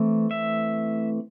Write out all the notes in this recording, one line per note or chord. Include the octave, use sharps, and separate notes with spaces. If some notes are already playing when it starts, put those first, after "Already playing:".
Already playing: E3 A3 C4
E5